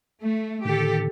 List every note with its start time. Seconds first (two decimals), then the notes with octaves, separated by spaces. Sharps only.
0.24 A3
0.65 A2 D3 D#3 G4 A4